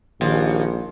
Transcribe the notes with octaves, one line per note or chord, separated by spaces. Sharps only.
A#1 D#2